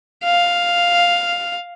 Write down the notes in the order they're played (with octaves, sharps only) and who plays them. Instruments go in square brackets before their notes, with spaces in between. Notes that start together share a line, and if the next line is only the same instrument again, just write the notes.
[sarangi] F5